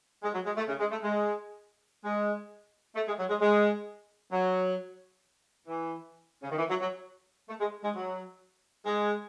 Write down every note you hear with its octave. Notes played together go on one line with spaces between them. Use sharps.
G#3
F#3
G#3
A3
C#3
G#3
A3
G#3
G#3
A3
G#3
F#3
G#3
G#3
F#3
E3
C#3
D#3
E3
F#3
F#3
A3
G#3
G#3
F#3
G#3